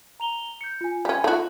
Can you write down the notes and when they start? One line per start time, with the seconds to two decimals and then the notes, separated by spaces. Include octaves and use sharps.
0.20 A#5 F7 G7
0.61 G6 C#7
0.81 F4 G#5
1.05 G3 C#4
1.24 A3 D#4 F4 F#4